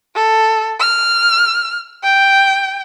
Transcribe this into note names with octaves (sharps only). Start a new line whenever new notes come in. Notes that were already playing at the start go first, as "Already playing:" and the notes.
A4
F6
G5